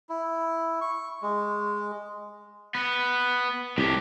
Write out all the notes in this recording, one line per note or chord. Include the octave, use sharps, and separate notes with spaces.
E4
C#6
G#3
B3
C2 A2 G4